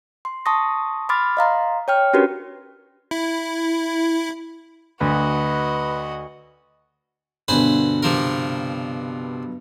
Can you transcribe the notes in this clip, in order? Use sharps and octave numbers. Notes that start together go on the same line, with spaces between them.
C6
A5 C6 C#6 D#6 A#6
B5 C6 D6 F6 A6
D#5 F5 A#5 C6
C#5 G5 F6
C#4 D4 F#4 G4 A#4 B4
E4
D2 F#4 B4 D#5
G2 B2 D3 B4 C5 G#5
C3 F3 A#4